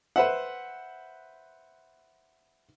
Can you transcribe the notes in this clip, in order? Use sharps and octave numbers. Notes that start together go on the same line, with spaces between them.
B4 C5 E5 F#5